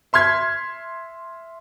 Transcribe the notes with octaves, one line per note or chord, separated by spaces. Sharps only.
E5 C6 F6 G#6 B6